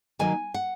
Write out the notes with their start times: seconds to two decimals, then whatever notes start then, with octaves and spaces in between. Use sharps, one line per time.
0.19 D#3 F#3 A#3 G#5
0.54 F#5